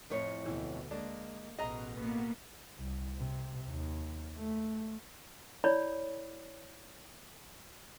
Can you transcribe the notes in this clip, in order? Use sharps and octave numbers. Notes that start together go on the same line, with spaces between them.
F2 A2 C#5
D2 B2 E3
G#3 A#3 D4
A1 B2 G#4 D#5 A#5
A#3 B3
C2
C3
D#2
A3
E4 C#5 D5 B5